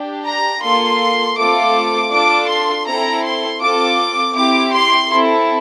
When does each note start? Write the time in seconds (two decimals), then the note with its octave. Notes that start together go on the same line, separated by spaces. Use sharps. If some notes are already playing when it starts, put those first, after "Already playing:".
Already playing: D4 G4
0.25 A#5
0.62 A#3 F4 A4 C6
1.37 A3 C4 F4 A4 D6
2.11 D4 F4 A4 D6
2.49 C6
2.86 C4 E4 A4 A#5
3.23 C6
3.60 C4 F4 A4 D6
4.34 C4 E4 G4 D6
4.72 C6
5.09 C4 E4 A4